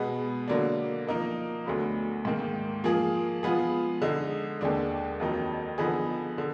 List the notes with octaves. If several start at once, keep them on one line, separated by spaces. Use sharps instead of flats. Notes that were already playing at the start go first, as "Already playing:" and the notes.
Already playing: B2 G#3 B3
D3 F#3 A#3 D4
F3 A#3 D#4 A#4
D2 D3 F#3 B3
G#2 D#3 A#3
F3 A#3 F4 G#4
F3 G#3 B3 F4 G#4
D3 G#3 D#4
D#2 D3 G#3 D4
F2 D#3 F#3 A#3 D#4
D3 F3 B3 D#4 G#4
D3